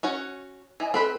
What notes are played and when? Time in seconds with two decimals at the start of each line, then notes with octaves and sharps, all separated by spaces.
0.03 C#4 F#4 C#5
0.80 E3 D#5 G#5
0.94 C4 A4 B4 B5